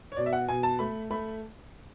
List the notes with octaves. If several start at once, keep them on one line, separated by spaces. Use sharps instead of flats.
C#5
B2 D5
E5
F#5
B2 G#5
A5
A3 B5
A3 B5